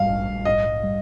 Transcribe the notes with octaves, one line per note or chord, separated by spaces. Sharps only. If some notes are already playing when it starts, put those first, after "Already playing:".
Already playing: G#2 G3 F5
A#1
G#2 D#5
G3